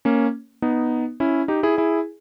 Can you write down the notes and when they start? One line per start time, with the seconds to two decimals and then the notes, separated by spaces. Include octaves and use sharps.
0.05 A#3 C#4
0.62 B3 D#4
1.20 C#4 E4
1.48 D#4 G4
1.63 E4 G#4
1.77 E4 G#4